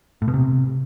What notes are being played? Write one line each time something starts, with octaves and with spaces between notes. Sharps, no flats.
A2
B2
C3